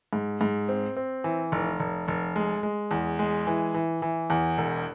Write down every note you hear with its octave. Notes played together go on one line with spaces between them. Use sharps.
G#2
G#2
C4
C4
E3
F1
F1
F1
G#3
G#3
E2
G#3
E3
E3
E3
E2
E1